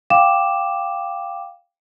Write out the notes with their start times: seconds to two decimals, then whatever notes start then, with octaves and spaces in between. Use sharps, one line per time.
0.10 F5 G5 D6 E7